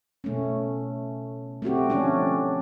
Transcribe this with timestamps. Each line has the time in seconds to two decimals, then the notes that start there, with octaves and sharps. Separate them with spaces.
0.24 B2 A3 C#4
1.62 A3 C4 F#4 G4
1.90 F3 A3 C#4 D4